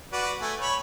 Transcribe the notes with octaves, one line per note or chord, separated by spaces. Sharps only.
F#4 B4 D5
A3 G#5
C#5 B5